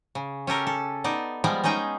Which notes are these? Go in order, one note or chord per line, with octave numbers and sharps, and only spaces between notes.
C#3
C#4 G4 A4 A#4
A4
B3 D#4 D5
F3 G3 G#3 B3 D5
G#3 C#4 D#4 G#4 G5